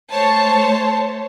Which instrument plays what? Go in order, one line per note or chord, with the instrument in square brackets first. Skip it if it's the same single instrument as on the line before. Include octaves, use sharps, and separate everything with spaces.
[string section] A3 C5 C#5 A5